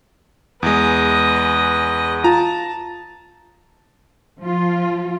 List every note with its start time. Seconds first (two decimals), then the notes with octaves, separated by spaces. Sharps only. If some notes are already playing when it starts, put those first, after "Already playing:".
0.63 E2 G#3 B4 D#5
2.24 F4 A5 A#5
4.39 F3 F4